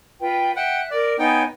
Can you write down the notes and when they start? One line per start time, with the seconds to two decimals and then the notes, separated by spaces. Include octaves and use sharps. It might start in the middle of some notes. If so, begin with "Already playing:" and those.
0.21 F4 B4 G5
0.56 E5 F#5 G5 F#6
0.91 A#4 D5
1.19 B3 D#4 C#5 G5 G#5